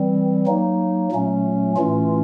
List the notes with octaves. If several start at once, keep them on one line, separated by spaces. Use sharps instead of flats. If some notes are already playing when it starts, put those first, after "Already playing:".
Already playing: E3 G3 C4
F#3 A#3 D#4
A#2 F#3 A3 C#4
A2 E3 A3 C#4 F4